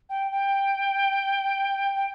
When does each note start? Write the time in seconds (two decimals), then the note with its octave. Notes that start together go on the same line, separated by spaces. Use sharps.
0.09 G5
0.31 G5
1.94 G5